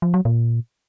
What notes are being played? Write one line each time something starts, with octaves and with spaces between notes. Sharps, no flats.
F3
F#3
A#2